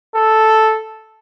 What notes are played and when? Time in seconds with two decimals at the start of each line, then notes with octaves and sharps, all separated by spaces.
0.15 A4